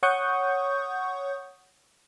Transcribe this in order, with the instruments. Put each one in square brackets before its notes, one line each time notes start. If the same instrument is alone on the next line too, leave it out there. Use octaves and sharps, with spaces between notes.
[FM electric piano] C#5 F#5 C#6 D#6 G6